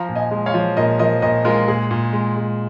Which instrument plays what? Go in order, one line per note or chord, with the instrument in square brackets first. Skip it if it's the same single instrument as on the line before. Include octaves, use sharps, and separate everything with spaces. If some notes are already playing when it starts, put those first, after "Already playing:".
Already playing: [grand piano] F3 F5 A#5
A#2
D#5 G#5
G#3
C#5 F5
F3
A#2 A#4 D#5
F3 A#4 D#5
A#2 A#4 D#5
G#3 F4 A#4
A#2 G#4
A#2
G#3
G#3